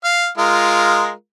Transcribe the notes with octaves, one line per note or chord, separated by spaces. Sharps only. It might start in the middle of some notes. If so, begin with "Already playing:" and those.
F5
G#3 F4 A#4